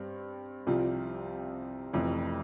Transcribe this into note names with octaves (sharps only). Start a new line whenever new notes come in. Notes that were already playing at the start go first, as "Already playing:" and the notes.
Already playing: G2 C4
C2 C3 F3 C4 F4
F1 F2 E3